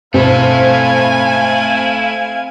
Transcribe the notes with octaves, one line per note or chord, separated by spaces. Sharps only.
G2 B2 A3 C4 E4 F5 G#5